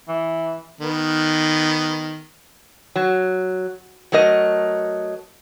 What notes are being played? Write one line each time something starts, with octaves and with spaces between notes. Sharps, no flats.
E3
D#3 B3
F#3
F#3 A3 A#4 D#5